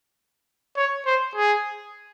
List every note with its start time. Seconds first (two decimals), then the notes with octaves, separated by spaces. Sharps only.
0.77 C#5
1.07 C5
1.36 G#4